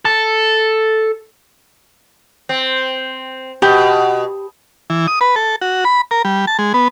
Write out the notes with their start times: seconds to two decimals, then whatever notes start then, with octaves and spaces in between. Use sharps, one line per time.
0.05 A4
2.49 C4
3.62 B2 G4
4.90 E3
5.07 D#6
5.21 B4
5.36 A4
5.61 F#4
5.85 B5
6.11 A#4
6.25 G3
6.47 A5
6.59 G#3
6.74 B3